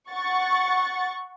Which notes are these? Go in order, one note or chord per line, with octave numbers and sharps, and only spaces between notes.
F#5 C#6 A6